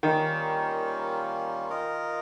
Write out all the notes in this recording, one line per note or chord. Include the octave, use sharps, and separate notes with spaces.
D#3 G3 A#3 C#4 F4
F4 A#4 D#5